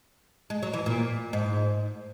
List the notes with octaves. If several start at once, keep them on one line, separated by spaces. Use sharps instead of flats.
G#3
F#3
E3
A#2
G#2